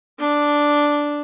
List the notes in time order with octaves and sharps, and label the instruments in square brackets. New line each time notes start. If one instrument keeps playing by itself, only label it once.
[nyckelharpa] D4